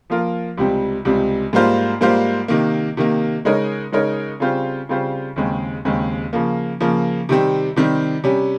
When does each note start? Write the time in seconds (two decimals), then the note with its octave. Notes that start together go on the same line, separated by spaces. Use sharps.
0.10 F3 A#3 F4 A#4
0.58 C#2 C3 G3 C4
1.05 C#2 C3 G3 C4
1.53 G#2 G3 A#3 F4 C5
2.01 G#2 G3 A#3 F4 C5
2.48 C3 D#3 A#3
2.97 C3 D#3 A#3
3.45 C#3 G#3 D#4 A#4 C#5
3.92 C#3 G#3 D#4 A#4 C#5
4.40 C#3 G3 C4 F4 C5
4.89 C#3 G3 C4 F4 C5
5.36 D#2 C#3 G#3 C4
5.85 D#2 C#3 G#3 C4
6.33 C#3 F3 A#3
6.80 C#3 F3 A#3
7.29 C3 D#3 G3 C4
7.76 C3 D#3 G3 C4
8.24 C3 G3 C#4